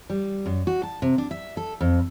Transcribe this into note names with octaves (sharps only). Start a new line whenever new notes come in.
G3
F#2
F#4
A5
C3
D4
E5
A4
F2